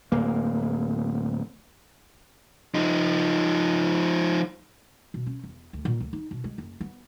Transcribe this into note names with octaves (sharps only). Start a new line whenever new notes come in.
D1 A#3
F3 D#4
B2
C#4
E2
D2
A#2
D2
D#4
B2
G#3
F#1
B3